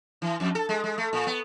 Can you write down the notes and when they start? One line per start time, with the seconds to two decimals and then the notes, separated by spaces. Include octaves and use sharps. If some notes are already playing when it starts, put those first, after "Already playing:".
0.22 E3
0.40 F2
0.55 A4
0.69 G#3
0.84 G#3
0.98 A3
1.13 A#2
1.27 B3